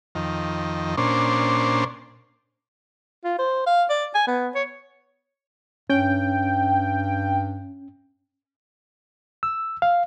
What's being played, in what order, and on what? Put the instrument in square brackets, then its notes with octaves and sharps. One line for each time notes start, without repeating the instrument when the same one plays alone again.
[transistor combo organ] F2 D#3
A#2 C#4 D4 C5
[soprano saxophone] F4
C5
F5
D5
G#5
B3
C#5
[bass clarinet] G2 [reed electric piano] C#4 [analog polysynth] G5
[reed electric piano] E6
F5